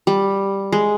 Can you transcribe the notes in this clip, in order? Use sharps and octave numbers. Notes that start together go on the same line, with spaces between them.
G3
G#3